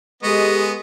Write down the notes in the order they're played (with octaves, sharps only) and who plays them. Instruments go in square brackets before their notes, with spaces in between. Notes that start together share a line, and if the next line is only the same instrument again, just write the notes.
[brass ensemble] G#3 [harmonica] B3 D#5 [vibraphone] G4 A4 C#6